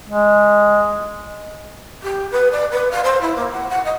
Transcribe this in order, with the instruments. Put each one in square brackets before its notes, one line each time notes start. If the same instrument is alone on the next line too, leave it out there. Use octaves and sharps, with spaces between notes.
[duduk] G#3
[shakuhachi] G4
B4
D5
B4
F5
C5
E4
A#3
F#5
F#5
D#5